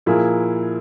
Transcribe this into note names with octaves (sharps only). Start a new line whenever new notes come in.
A#2 F3 A#3 E4 G#4